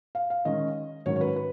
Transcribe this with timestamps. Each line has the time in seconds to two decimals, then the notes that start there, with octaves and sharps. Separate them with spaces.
0.15 F5
0.30 F5
0.45 D#3 G#3 C#4 D#5
1.06 G#2 D#3 F#3 C#4 C#5
1.16 C#5
1.21 B4
1.36 B4